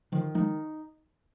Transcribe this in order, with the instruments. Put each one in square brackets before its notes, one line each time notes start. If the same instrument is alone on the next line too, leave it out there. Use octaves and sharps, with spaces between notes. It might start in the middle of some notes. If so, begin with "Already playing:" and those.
[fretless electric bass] D3 F3 [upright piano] D#3
[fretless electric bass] F3 G#3 [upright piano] D#4